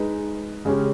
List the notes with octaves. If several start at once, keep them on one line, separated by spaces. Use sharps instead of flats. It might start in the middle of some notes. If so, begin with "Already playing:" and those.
Already playing: G#3 D#4 G#4 B4
C#3 G#3 C#4 G4